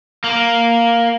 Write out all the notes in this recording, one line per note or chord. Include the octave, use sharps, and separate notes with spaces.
A#3